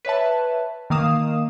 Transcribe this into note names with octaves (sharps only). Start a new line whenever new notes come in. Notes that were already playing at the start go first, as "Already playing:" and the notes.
B4 C#5 E5 A5
D#3 A#3 F5 D#6 E7